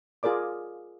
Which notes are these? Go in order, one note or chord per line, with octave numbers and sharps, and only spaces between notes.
F4 G#4 A#4 D5 D6